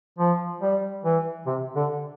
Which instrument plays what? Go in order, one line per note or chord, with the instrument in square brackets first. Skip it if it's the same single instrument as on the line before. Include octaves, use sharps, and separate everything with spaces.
[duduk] F3
G3
E3
C3
D3